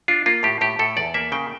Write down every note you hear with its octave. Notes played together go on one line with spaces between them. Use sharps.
D4 F4
A#3 F4
A2 G4
A2 G4
A2 A4
E2 D5
A#3 E5
C#3 G5